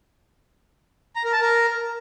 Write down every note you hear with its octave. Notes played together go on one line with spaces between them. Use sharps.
A#5
A#4
A5
A#4